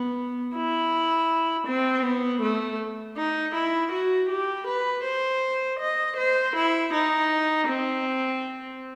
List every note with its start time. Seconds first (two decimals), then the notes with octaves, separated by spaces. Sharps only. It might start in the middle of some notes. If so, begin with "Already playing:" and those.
Already playing: B3
0.55 E4
1.67 C4
2.04 B3
2.42 A3
3.17 D#4
3.55 E4
3.92 F#4
4.29 G4
4.67 B4
5.05 C5
5.79 D#5
6.17 C5
6.56 E4
6.93 D#4
7.68 C4